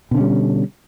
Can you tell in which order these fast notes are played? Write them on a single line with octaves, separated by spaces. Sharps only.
B2 D3 C#4 G3